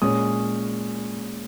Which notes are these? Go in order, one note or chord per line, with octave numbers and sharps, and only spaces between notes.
A#2 G#3 C#4 D#6